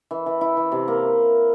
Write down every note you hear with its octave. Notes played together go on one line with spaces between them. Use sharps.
E3
E3
E4
E3
C3
A#3